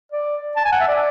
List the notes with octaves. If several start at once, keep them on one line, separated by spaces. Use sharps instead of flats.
D5
A5
G#5
F#5
E5
D5